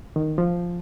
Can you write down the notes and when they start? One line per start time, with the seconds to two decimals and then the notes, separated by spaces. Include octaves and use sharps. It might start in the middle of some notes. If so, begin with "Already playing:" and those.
0.16 D#3
0.38 F3